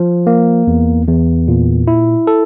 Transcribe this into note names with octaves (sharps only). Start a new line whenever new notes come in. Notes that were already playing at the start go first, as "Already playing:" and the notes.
Already playing: F3
A#3
E2
E2
A#2
E4
A4